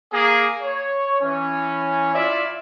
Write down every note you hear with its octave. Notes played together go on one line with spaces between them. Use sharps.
A#3 G#4
C#5
E3 C#4
E4 F4 D5 E5